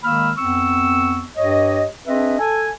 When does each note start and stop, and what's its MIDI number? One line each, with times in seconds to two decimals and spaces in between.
0.03 0.31 51
0.03 0.31 56
0.03 0.31 58
0.03 0.31 83
0.03 0.31 88
0.03 0.31 89
0.37 1.24 41
0.37 1.24 59
0.37 1.24 60
0.37 1.24 85
0.37 1.24 88
1.37 1.85 43
1.37 1.85 67
1.37 1.85 73
1.37 1.85 75
2.06 2.38 60
2.06 2.38 62
2.06 2.38 68
2.06 2.38 71
2.06 2.38 75
2.06 2.38 76
2.39 2.69 69
2.39 2.69 80